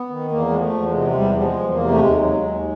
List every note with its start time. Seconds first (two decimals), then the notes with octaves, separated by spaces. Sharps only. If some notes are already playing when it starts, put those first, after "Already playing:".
Already playing: B3
0.10 D#3
0.31 E2 A#3
0.50 F3 G#3
0.59 A3
0.73 E2
0.87 G#3
0.94 C3
1.11 G#3
1.16 E2 G3
1.35 F3 G3
1.44 G#3
1.59 E2
1.72 A#3
1.79 C3
1.90 A3
2.00 D#2 G#3
2.21 F#3
2.42 D#2